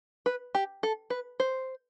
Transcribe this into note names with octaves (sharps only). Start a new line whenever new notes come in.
B4
G4
A4
B4
C5